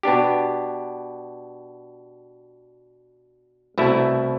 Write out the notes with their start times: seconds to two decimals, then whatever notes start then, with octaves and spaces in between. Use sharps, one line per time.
0.03 B2 B3 D4 G4
3.78 C2 B2 A3 E4